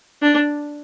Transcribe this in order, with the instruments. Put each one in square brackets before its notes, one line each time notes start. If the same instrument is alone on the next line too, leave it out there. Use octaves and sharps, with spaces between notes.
[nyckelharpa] D4